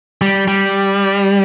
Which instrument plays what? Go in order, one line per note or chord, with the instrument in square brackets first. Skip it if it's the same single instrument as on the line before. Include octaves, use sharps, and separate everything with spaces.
[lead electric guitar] G3
G3